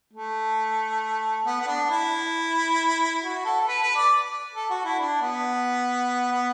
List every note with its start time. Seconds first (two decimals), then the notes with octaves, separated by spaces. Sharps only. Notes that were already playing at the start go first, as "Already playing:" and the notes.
0.13 A3
1.46 B3
1.61 B3
1.68 D4
1.90 E4
3.22 F#4
3.45 A4
3.60 A4
3.67 B4
3.82 B4
3.96 D5
4.55 A4
4.70 F#4
4.85 E4
4.99 D4
5.21 B3
6.32 B3